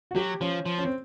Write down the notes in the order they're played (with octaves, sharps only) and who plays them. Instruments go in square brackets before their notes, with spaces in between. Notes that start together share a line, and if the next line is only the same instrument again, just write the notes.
[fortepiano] F#4
[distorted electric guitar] F#3 [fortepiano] G4
[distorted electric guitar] F3 [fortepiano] C#4
[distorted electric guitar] F3
[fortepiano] C#4
C4